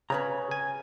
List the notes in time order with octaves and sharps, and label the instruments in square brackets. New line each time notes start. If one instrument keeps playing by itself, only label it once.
[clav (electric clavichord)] C#3 [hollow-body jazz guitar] B4 C#5 A#5
[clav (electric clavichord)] G#5